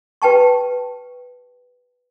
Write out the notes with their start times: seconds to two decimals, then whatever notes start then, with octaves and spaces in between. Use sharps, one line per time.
0.22 G4 B4 G5 A5 C#6